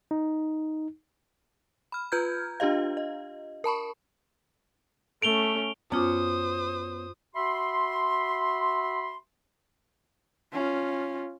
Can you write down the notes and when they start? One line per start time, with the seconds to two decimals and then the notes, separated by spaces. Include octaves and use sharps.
0.11 D#4
1.92 B5 F6
2.12 F4 B4 A#5 F6 G6 G#6
2.60 D4 F4 G4 D#5 F5
2.97 D#5
3.64 A#4 A5 B5 C#6
5.22 A3 C#4 D7 F7 G7
5.92 F#2 B3 C#4 F4 C5 D6 D#6
7.35 F#4 E5 B5 C6
10.53 C#4 F4